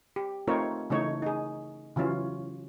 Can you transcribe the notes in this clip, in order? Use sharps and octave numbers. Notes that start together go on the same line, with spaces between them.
G4
A3 C4 D#4 F4 A#4 C#5
C#3 E3 A3 D#4 C#5
D#4 G#4
C#3 E3 F#3 C#4 F4